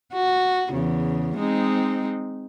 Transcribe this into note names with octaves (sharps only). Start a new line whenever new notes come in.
F#4
E2 C#3
G#3 C4 D#4